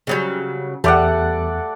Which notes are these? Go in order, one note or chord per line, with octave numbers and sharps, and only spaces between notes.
C#3 F#3 G3
E2 G3 A3 D5 F#5